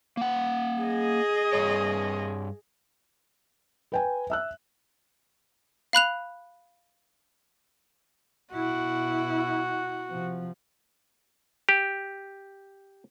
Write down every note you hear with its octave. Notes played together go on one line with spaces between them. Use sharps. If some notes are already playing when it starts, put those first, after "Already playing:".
A#3 F#5
G#4 D#5
G2 C#5
B4 G5 G#5
E5 E6 F#6
F5 B5 F#6 F7
B2 E4 F#4
C3 F3
G4